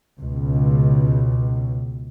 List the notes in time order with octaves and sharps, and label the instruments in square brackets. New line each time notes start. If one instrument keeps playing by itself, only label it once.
[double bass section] C#2 B2